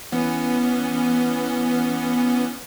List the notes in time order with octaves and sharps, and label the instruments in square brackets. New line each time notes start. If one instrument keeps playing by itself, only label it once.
[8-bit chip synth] E3 B3 C#4